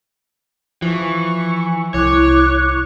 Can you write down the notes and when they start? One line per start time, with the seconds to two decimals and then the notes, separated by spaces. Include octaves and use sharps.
0.82 E3 F3 C#6
1.94 C2 E4 C#5 C#6 D6 F#6